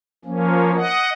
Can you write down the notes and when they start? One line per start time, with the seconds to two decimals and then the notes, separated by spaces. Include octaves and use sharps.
0.25 F3 A#3 C#4
0.76 D#5 F#5